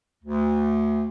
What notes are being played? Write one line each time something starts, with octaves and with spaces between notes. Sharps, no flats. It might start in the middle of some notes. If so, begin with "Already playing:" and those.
D2